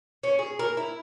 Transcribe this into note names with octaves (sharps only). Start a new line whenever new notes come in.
C#4
G#4
A#4
E4